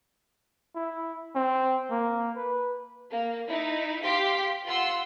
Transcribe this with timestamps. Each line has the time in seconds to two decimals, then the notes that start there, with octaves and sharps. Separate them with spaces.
0.75 E4
1.35 C4
1.91 A#3
2.36 B4
3.11 A#3
3.49 D#4 E4
4.04 G4 F5 C6 D6 B6
4.65 F4 F#5 C6 E6